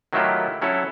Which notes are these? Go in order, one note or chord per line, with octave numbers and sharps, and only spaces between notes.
D#3 F#3 A3 E4 F4 G4
F#3 C#4 E4 A4 C#5